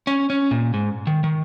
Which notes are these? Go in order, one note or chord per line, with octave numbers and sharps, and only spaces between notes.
C#4
C#4
A#2
G#2
D#3
D#3